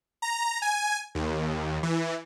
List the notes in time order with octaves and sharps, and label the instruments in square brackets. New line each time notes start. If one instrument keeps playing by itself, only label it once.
[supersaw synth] A#5
G#5
D#2
E3